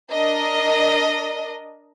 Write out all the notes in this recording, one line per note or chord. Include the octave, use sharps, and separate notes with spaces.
D4 A#4 D#5